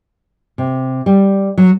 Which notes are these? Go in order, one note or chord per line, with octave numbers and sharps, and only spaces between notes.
C3
G3
F#3